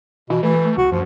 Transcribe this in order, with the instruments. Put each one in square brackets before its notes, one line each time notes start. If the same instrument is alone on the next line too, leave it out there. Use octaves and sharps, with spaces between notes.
[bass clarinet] B2 [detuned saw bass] E3
[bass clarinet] E3 [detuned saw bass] A3
[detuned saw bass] C2 [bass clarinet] F#4
[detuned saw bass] F#2 [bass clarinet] F3